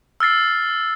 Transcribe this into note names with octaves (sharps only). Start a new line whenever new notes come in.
E6 F6 A6 C7